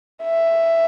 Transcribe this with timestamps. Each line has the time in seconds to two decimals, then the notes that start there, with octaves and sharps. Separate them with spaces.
0.23 E5